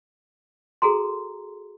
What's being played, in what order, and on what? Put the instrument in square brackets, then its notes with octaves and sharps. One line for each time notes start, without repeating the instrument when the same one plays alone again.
[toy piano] F#4 G#4 A4 A#5 C6